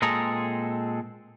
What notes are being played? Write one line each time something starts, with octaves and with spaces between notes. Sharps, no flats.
A#2 G#3 C4 G#4 A4 A#5